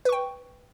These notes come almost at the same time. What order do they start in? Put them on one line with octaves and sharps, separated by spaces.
B4 C#6 G5